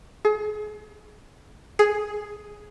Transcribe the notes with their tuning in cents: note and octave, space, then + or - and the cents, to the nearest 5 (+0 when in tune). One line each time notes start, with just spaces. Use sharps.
G#4 +35
G#4 +5